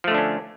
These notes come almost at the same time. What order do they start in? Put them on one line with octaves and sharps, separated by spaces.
F3 A3 D3 D4 C#4